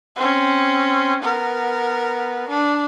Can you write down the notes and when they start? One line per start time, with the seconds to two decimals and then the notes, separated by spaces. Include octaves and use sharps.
0.16 C4 C#4
1.22 B3 A#4
2.48 D4